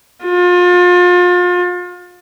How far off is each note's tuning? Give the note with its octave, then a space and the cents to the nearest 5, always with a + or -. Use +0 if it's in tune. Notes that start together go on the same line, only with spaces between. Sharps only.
F4 +35